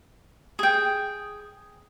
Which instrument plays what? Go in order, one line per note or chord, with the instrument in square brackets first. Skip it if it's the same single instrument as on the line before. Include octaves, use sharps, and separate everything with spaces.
[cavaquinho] G#4 G5